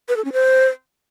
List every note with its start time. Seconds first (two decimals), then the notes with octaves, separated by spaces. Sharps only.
0.09 B4
0.17 A4
0.25 C#4
0.33 C5